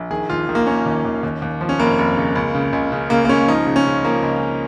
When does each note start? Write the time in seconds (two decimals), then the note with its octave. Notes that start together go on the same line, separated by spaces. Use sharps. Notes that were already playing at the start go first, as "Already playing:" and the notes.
Already playing: A#1
0.10 D#3 G#4
0.30 D#2 F4
0.49 D#3
0.55 A#3
0.67 D#3 C#4
0.86 D#2
1.05 D#2
1.23 D#2
1.42 D#2
1.61 F3
1.69 C#4
1.79 F1 A#3
1.99 F1
2.17 C#3
2.36 C#2
2.55 C#3
2.73 C#2
2.92 C#3
3.10 C#3 A#3
3.25 A#3
3.29 C#2 C#4
3.48 F3 D#4
3.67 C#3
3.76 C#4
3.86 C#3
4.05 F3 A#3
4.23 C#2